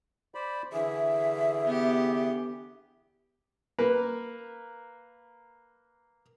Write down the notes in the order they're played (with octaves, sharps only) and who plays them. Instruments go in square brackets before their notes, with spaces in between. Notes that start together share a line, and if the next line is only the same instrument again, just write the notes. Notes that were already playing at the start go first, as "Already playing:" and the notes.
[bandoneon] C5 D5 B5
[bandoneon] D3 E3 G#4 [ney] E5
[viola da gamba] B3 G4
[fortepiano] A#3 A#4 B4